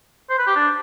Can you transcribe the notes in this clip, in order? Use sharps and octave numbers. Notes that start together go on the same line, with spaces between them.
C5
B4
G4
D4